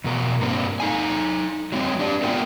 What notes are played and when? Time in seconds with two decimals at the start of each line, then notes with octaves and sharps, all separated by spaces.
0.04 E2 B2 A#4
0.41 G2 A#3 C4
0.80 D#4 A4 G#5
1.72 F#3 G#3 C4 C#5
1.99 D4 G4 D5
2.23 A3 B3 F4 A#4 G5 G#5